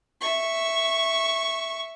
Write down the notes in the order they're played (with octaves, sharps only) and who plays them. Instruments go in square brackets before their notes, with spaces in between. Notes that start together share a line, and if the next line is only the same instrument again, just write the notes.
[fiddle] E5 C#6